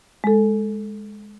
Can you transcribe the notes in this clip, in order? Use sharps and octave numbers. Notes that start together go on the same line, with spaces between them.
G#3 A4